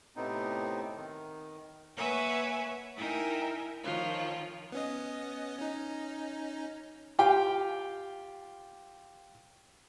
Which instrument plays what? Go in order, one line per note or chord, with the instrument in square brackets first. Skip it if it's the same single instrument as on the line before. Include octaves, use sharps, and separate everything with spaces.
[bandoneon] A2 C3 B3 C4 D#4
D#3
[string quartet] A#3 B4 C#5 E5 F#5 G#5
D#4 E4 A#4 E5 G5 G#5
D#3 F3 F4 C#5
[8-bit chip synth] B3 C#4 D#5
C#4 D#4
[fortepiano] F4 G4 F5 G5